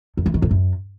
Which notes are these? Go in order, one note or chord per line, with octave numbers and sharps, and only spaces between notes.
F2
E3
D#3
F2
F#2